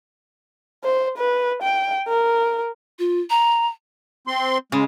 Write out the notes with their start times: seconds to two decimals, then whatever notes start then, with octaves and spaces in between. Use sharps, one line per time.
0.84 C5
1.17 B4
1.62 G5
2.08 A#4
2.99 F4
3.30 A#5
4.27 C4 C6
4.72 C#3 G#3